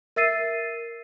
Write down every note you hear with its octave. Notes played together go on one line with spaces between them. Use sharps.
A#4 E5 E6 A6 C7 D#7